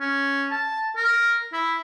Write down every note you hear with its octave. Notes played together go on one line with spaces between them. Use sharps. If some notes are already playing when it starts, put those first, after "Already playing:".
C#4
A5
A#4
E4